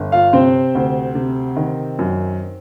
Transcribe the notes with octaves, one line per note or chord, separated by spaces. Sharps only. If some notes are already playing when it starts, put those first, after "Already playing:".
Already playing: G1
F4 F5
C3 C4 C5
D2
C3
D#3
F#2